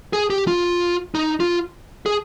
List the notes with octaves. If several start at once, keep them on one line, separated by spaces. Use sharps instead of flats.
G#4
G4
F4
D#4
F4
G#4